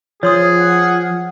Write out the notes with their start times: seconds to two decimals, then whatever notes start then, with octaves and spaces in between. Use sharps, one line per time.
0.23 F3 G#4 C#5 C6 D#6
0.58 F#5